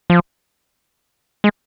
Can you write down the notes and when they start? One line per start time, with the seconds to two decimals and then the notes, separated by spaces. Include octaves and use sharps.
0.10 F3
1.44 G#3